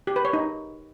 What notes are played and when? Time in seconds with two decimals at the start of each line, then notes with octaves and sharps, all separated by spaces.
0.07 G4
0.16 B4
0.25 C#5
0.33 D#4